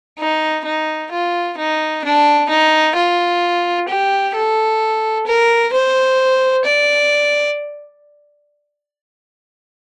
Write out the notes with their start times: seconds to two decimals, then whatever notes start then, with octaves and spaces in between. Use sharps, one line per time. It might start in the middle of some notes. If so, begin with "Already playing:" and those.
0.19 D#4
0.65 D#4
1.11 F4
1.57 D#4
2.04 D4
2.50 D#4
2.96 F4
3.89 G4
4.35 A4
5.27 A#4
5.73 C5
6.65 D5